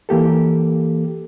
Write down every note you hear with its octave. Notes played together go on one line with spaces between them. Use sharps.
E3 A#3 G4 A4